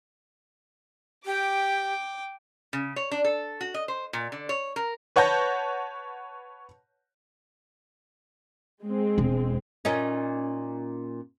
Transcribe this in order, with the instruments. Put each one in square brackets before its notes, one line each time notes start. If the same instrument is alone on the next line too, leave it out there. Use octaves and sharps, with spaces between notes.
[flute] G4 [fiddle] G5 D6
[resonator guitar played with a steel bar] C#3
C#5
D4
A4
F#4
D#5
C5
A#2
D3
C#5
A#4
[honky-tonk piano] B4 C#5 F#5 A5 G6 A#6
[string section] G#3 C4
[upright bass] E1
[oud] A#2 C#4 D#4